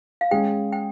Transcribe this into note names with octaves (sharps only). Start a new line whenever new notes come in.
F5
G#3 C#4 G#4 G5
G5